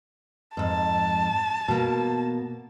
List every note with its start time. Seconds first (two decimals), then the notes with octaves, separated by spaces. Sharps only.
0.57 F2 G#2 A5
1.68 B2 A#3